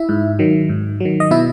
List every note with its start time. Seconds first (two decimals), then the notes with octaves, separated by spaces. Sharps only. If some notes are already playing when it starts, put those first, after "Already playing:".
Already playing: E4 E5
0.09 G#2
0.39 D#3 F#3
0.69 G#2
1.00 D#3 F#3
1.20 D#5
1.31 B2 E4 E5